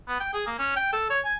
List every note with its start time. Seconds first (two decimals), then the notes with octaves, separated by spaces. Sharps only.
0.08 B3
0.20 G5
0.34 G#4
0.47 A#3
0.59 C#4
0.77 G5
0.93 A4
1.10 C#5
1.25 G#5